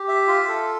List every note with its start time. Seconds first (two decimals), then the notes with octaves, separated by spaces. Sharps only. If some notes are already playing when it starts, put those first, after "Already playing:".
Already playing: G4
0.08 E5
0.27 F4
0.48 A4